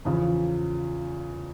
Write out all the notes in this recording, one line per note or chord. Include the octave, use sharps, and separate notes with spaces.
E2 C#3 F3